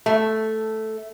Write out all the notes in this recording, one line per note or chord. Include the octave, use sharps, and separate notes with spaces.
A3